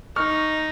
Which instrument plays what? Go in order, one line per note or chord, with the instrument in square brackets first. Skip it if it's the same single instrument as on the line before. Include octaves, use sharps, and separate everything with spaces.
[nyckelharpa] D#4 [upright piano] C#6 F6